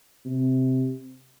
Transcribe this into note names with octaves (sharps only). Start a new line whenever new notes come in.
C3